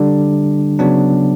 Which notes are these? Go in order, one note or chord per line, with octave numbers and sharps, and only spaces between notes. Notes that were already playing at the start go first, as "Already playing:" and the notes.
Already playing: D3 G3 D4
C#3 F#3 B3 D4